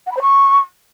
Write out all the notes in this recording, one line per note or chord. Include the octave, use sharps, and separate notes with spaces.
F#5
B5
C5
C#6